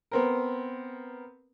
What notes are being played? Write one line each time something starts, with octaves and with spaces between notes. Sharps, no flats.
B3 C4 A#4